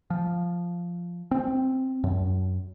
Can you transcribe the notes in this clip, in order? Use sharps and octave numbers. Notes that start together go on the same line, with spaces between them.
F3
C4
F#2